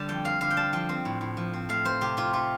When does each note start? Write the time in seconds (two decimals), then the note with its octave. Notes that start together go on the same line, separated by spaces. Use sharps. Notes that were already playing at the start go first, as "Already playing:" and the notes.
Already playing: D3 G3 A5
0.08 F2 G5
0.25 C4 F5
0.41 D3 F5
0.50 G5
0.56 G3 A5
0.73 F3 G5
0.89 C4
1.05 A2
1.21 A2
1.37 F3
1.53 C4
1.69 A3 F5
1.85 C4 C5
2.01 C3 G4
2.17 C3 F4
2.33 A3 F4